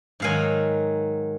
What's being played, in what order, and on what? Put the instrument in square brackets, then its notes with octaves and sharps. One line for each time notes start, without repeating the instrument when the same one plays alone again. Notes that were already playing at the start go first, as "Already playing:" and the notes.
[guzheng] G#2 D#3 F#3 F5 G#5